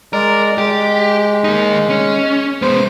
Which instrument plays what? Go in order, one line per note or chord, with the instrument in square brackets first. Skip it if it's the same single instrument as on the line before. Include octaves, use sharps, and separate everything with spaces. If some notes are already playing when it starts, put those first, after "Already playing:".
[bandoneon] G#3 D5 [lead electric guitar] A#4
[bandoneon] G#3 [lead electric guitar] G4
[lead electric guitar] A#3 D#4
C#4
[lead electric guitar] G#3 B3 [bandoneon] C5